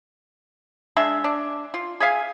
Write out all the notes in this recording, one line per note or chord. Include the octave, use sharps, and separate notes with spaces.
G#3 D4 E5
D4
F4
G#4 E5 F5 G#5